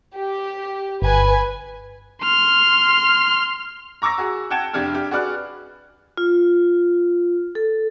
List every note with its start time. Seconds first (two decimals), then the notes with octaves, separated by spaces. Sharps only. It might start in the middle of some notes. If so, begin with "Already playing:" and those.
0.15 G4
1.02 G1 B4 G#5
2.22 C6 F6
4.02 A#5 C#6 D6 E6 A#6
4.18 F#4 G#4
4.50 F#5 G5 A5 G#6 E7
4.73 F1 D4 G4 F6 G#6
4.95 G4
5.11 F#4 G#4 B4 D5 F6 F#6
6.17 F4
7.55 A4